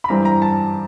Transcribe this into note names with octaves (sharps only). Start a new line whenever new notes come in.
B5
G2 E3 G3 C4 A#5
A#5
A5